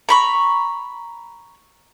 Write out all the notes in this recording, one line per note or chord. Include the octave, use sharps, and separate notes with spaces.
A#5 B5 C#6